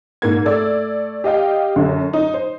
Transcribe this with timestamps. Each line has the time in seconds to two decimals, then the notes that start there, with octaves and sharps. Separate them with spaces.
0.22 G#2 A#3 G#6
0.45 A3 D5 E6
1.24 G4 D#5 F5 G5
1.76 F#2 D3
2.13 D#4
2.34 C5